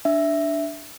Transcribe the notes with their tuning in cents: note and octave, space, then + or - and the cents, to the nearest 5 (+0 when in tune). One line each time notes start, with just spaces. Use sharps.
D4 +0 E5 +0